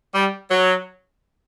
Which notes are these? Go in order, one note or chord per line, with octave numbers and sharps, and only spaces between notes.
G3
F#3